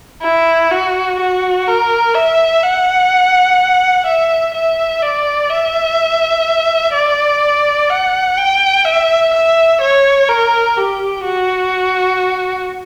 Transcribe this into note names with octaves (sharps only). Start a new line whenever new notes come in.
E4
F#4
F#4
A#4
E5
F#5
E5
E5
D5
E5
D5
F#5
G5
E5
E5
C#5
A#4
G4
F#4